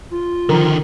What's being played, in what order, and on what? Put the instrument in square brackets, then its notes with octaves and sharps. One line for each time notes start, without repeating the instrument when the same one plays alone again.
[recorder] F4
[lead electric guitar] D3 D#3 [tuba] F3 [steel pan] A#4